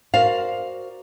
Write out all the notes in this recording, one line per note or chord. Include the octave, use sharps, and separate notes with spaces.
F#4 A#4 C5 D5 F5